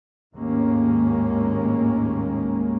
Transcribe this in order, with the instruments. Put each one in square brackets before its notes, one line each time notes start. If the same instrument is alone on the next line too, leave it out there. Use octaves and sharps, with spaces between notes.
[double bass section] G#1 D#2 A2 G#3 A#3 C#4